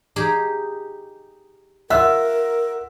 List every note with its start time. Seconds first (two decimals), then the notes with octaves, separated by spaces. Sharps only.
0.16 D#4 G4 G#4
1.90 F4 A#4 E5 F#5 E6